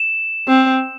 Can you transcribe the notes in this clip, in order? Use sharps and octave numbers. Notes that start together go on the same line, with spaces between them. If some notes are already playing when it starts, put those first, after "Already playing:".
Already playing: E7
C4